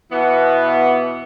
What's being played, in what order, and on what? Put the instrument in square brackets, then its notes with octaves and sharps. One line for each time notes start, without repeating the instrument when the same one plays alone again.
[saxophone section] B2 E3 B3